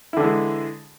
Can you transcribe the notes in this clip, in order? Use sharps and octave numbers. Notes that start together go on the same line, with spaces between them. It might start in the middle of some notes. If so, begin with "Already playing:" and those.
D3 E3 G#3 E4